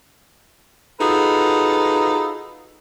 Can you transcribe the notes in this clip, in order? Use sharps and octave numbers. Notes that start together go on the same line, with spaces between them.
D#4 F4 F#4 G#4 A4 B4